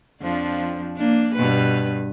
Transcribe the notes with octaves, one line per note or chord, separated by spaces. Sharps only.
F2 F3 D4
A#3 D4
G2 B2 B4